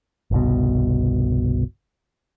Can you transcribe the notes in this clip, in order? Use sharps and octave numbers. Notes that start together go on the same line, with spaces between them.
G1 C2 B2